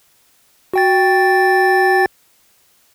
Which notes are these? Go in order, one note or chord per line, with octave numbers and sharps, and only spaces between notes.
F#4 G5 A6